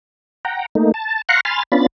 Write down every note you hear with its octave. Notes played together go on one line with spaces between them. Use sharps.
F#5 G5 A#5
A3 A#3 D#4
A5
F5 F#5 A#5 C6 C#6 F#6
G#5 B5 C6 F6 A6
B3 C#4 D4 F4 B5 A6